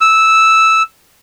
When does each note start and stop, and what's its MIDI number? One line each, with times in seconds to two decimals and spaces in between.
0.01 0.83 88